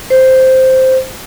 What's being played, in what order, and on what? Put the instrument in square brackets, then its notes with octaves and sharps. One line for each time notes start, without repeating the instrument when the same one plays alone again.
[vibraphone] C5